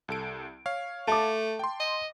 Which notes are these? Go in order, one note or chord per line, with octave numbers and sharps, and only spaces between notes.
C2 A4 D7
C#5 F5
A3 A5 D6
G5 C6
D#5